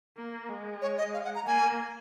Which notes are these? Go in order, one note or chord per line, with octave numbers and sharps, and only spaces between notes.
A#3
G#3
C#5
D#5
F5
F#5
A#5
A#3 G#5